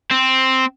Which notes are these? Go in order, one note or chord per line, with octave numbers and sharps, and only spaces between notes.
C4